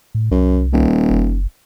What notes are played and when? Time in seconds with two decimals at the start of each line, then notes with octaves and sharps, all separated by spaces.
0.15 A2
0.31 C2 F#2
0.73 D#1
1.10 F#1